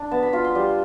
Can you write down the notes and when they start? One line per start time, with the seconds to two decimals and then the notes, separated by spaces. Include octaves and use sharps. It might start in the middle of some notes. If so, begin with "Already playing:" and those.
Already playing: D4
0.11 B3 A5
0.23 B5
0.33 F4 B5
0.44 C6
0.55 G3